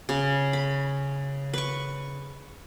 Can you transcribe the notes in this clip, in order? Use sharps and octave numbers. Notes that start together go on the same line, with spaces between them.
C#3
B5
B4 C#6